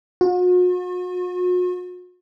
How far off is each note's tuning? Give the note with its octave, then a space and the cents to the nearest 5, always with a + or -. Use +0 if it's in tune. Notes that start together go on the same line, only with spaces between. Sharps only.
F#4 -45